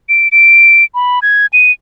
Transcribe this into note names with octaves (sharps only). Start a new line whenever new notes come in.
D7
D7
B5
G#6
D#7